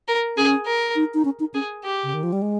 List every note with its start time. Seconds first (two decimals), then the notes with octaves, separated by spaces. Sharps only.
0.08 A#4
0.37 C#4 G#4
0.66 A#4
0.96 D#4
1.14 D#4
1.25 C#4
1.40 D#4
1.54 C#4 G#4
1.84 G4
2.03 C#3
2.14 D#3
2.23 F3
2.33 G3
2.42 G#3